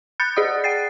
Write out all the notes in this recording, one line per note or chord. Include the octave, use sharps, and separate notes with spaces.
B5 F#6 G6 A6 C#7
G#4 D5 D#5 F#5 D#6
F#5 G5 A6 C7